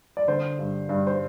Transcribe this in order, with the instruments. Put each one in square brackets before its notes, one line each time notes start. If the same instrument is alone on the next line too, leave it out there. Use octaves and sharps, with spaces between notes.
[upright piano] D5
D3 C5
G2
G2
C5